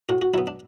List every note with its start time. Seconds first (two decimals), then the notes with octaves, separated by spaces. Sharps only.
0.09 A2 F#4
0.22 F#4
0.34 F#3 B3 E4
0.47 D4